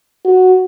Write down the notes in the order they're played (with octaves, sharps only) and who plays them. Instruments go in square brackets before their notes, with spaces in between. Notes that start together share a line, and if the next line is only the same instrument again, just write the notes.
[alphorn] F#4